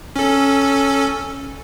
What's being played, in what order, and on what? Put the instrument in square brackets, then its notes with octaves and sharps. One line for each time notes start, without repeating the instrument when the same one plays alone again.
[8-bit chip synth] C#4 A4